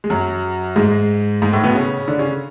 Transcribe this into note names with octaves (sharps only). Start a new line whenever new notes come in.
G#3
F#2 F#3
G#2 G#3
G#2 G#3
A2 A3
B2 B3
C#3 C#4
D3 D4
C#3 C#4